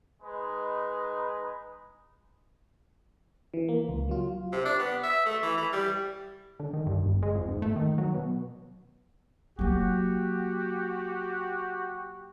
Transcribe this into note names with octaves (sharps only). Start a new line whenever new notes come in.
G#3 D#4 B4
E3
A#3
C#2
F#3 F4
C3
D4
B3
E5
A3
E3
E3
G3
D3
D#3
G2
G1
G#3
F2
G#2
A3
D#3
F#3
B2
F#3 A#3 F#4 G4